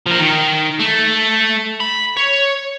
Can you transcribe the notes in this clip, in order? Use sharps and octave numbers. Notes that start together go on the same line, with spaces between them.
F3 A#4
D#3
A3
B5
C#5